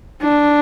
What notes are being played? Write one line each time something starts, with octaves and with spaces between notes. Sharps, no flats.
D4